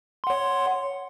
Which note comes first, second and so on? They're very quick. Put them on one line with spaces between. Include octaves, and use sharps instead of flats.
C6 F#5 C#5